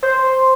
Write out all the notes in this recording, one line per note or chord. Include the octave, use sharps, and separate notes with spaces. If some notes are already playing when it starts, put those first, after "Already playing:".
C5